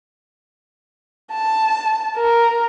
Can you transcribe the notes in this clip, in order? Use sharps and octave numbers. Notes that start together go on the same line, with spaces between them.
A5
A#4